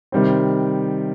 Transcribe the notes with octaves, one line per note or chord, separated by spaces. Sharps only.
C3 D#3 G3 C4